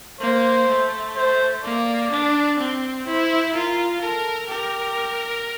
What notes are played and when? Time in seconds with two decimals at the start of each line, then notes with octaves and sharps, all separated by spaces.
0.21 A#3 C5
0.69 A3
1.16 C5
1.63 A#3 D5
2.11 D4
2.59 C4
3.06 E4 C5
3.54 F4 A#4
4.01 A4 A#4
4.49 G4 A#4